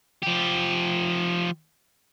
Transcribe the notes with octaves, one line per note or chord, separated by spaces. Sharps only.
F3 G4